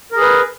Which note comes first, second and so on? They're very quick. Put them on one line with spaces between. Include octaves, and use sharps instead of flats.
A#4 G#4 B4